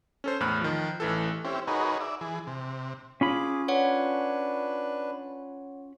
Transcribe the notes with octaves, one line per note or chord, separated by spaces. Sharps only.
C#4 A4 C5
E2 A2 B5 F6 F#6
D#3 F3
A1 E3 A4
C4 C#4 E4 G4
D#4 F#4 G#4 A#4 B4 C#5
D5 E5
E3 G#4
C3
C#4 F4 G#4 B5 D6
D4 B4 C#5 F#5